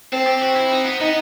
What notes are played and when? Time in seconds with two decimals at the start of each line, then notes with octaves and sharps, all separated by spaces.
0.13 C4 A4
0.27 G4
0.42 F#4
0.56 E4
0.72 D#4
0.85 B3
1.00 B3 D#4